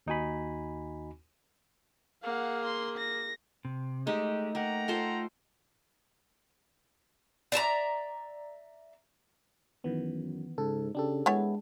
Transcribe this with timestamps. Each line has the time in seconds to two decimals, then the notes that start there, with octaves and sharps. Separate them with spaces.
0.07 D#2 D#4 F#4 G#5 B5
2.23 A#3 G#4 F5 F#5
2.65 C6
2.98 A#6
3.65 C3
4.07 G#3 A3 D#4 G4
4.55 A#3 F#5 G5 A#5
4.88 F4 A4 C5
7.52 D5 E5 A5 A#5
9.84 F#2 D#3 E3 B3
10.58 G#2 C#3 A4
10.95 C#3 D4 G4 A4
11.26 E3 G#3 B3 C#5